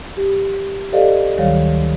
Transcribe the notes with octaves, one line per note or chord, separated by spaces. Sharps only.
G4
G4 A4 C5 D5 D#5 F5
D2 D#3 F#3 G3 C#5 F5